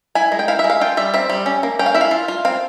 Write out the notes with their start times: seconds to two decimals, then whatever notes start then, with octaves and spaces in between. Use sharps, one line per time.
0.15 E4 G#5
0.32 G#3
0.39 G5
0.48 E4 F5
0.59 E5
0.64 G#3
0.70 F5
0.81 F4 G5
0.97 G3 E5
1.14 C4 E5
1.29 G3
1.46 C#4
1.63 A#3
1.79 C#4 G5
1.86 F5
1.94 E4 E5
2.01 F5
2.11 F4
2.28 F4
2.45 C4 F5